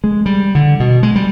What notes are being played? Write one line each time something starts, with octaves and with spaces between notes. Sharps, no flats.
G#3
G3
D3
B2
G#3
G3